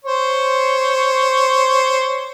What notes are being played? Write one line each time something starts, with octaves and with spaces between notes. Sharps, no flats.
C5 C#5